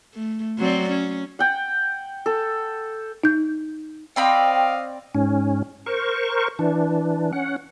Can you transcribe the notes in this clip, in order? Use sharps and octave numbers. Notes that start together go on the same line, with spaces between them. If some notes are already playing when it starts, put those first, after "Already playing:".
A3
F#3 C4 D5
C#4
F#5 G5
A4
D#4 G6
C4 D5 D#5 F5 G5 B5
G#2 C#4
A#4 C5 C#6
E3 D4
C#4 F#5